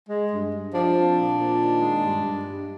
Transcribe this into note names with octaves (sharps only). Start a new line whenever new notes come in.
G#3
G2
G2
F3 D4
C4
A#2
A#2
D#3
G#3
G2
G2
G3